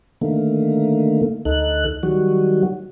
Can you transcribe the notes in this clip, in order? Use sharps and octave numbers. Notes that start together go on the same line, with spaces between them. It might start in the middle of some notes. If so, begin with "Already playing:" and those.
D3 D#3 A3 A#3
D2 D#4 A4 F#6
D#3 F#3 G3 F#4